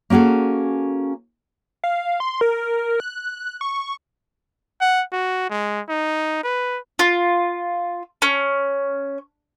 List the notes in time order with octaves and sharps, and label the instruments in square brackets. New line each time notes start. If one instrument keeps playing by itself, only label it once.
[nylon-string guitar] A#3 C#4 F#4 G#4 A4
[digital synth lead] F5
C6
A#4
F#6
C#6
[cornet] F#5
F#4
G#3
D#4
B4
[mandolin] F4
C#4